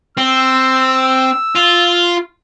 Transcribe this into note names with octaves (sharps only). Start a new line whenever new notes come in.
C4 E6
F4